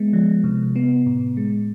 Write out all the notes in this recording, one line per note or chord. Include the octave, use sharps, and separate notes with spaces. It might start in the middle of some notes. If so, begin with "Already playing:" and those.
Already playing: G#3 B3
F3
C3
B3
A2
G#3